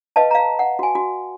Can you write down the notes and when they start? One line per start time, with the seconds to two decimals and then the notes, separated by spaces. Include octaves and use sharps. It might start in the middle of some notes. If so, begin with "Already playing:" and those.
0.16 B4 D#5 F5 A5
0.31 F5 A#5
0.59 F#5
0.79 F#4 G#5
0.95 F#4